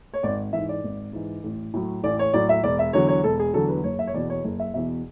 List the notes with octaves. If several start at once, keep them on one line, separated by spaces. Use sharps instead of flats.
C#5
G#1 D5
G#2 E3 E5
D5
G#1
G#2 E3
A1
A2 F#3
A1 D5
C#5
A2 F#3 D5
E5
E1 D5
E5
E2 D3 F#3 C#5
C#5
E1 A4
G#4
E2 D3 F#3 A4
B4
F#1 C#5
E5
C#5
E2 B2 D5
C#5
F#1
E5
E2 B2 E5